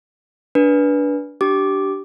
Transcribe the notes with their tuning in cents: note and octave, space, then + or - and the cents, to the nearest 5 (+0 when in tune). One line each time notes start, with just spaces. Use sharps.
D4 -15 B4 -20
D4 +0 G4 -20 D6 +0